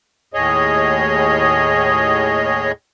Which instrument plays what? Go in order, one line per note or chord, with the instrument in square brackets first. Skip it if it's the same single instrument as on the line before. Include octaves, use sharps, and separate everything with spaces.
[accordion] D#2 A2 G#4 C#5 D#5